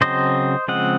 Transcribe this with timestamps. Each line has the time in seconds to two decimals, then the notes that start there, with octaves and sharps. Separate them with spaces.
0.01 C#3 F#3 C4 C5 D#5
0.68 C#3 F3 G#3 C4 D#5 F#5